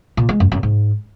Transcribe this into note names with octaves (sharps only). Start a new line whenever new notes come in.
A#2
G#3
F#2
F#2
G#2